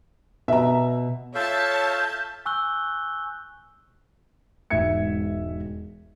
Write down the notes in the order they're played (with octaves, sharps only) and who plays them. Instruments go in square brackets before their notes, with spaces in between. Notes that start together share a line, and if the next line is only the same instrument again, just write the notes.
[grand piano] B2 [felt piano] E5 A#5
[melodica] F4 A4 F5 [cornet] C#5 [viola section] E5 A5 [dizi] G6
[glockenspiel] G#5 C#6 E6 F#6 G6 G7
[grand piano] E1 G#2 E5 G#6 C#7